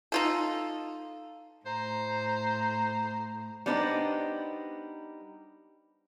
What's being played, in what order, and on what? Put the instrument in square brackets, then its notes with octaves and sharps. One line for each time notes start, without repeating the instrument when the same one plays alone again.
[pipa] D#4 F4 A4
[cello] A2 [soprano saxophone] C5 [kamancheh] A#5
[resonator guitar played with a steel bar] G3 B3 D4 D#4 B4 C5